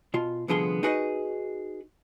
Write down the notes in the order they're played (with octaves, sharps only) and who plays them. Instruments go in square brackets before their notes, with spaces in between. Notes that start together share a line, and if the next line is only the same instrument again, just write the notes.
[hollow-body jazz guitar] B2 F4
C2 D3 F3 B3 G#4 C6
D#4 F#4 G#4 B4 D#5